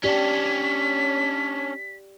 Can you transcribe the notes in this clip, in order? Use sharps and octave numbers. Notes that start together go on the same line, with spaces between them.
C#4 D4 G4 D5 B6